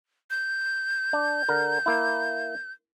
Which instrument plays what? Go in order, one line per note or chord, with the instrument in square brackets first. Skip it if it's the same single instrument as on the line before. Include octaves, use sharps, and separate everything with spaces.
[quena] G6
[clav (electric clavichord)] D4
D3 A#4
A#3 E4